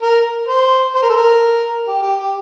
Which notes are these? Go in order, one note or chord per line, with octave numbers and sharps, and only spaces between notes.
A#4
C5
C5
A#4
A4
A#4
G4
G4
G4